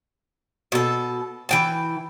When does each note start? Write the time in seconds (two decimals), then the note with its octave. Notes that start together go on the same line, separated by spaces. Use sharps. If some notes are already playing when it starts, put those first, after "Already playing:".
0.72 B2 A4
1.49 E3 G5 A5